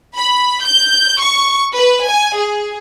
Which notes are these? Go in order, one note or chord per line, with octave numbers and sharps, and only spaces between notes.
B5
G6
C#6
B4
G#5
G#4